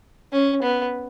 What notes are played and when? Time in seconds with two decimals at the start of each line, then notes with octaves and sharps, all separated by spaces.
0.32 C#4
0.62 B3